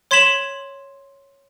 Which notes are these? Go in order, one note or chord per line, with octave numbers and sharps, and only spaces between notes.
C#5 C6 G#6 B6 E7 F#7